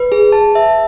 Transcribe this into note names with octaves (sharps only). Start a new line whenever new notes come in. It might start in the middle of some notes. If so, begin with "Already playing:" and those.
Already playing: B4
G#4
A5
E5